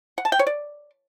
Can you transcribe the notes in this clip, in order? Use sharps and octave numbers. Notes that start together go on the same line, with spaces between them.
F#5
A5
G5
C#5
D5